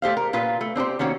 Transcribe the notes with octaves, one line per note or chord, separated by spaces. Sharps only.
A3 G4 C5 F5
A#4
A#2 F4 B4
A3
C4 D4 G4 C5
D#3 A#3 C#4 F#4